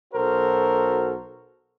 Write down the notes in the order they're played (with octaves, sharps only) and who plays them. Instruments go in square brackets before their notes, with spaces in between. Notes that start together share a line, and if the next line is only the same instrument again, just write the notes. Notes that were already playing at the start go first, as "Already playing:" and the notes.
[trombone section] B1 F#4 A4 A#4 C5